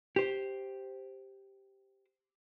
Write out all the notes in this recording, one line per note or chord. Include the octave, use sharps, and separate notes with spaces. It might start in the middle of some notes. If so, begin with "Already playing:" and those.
G4 C5